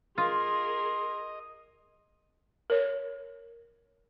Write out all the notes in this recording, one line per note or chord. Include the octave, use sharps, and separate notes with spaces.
F4 G#4 A#4 D#5 C6
A#4 C#5